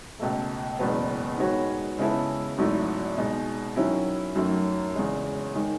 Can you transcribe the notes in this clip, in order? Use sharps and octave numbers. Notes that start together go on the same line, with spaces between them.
C#2 B2 A3
F#1 E2 B2 G#3 B3
D#3 G#3 B3 F#4 C#5
C#3 G#3 B3 E4 A4
G#1 G#2 F#3 A3 E4
B2 G#3 D#4
D#3 F#3 C#4 E4
F#2 D#3 F#3 A3
E2 C#3 G#3
D#3 G#3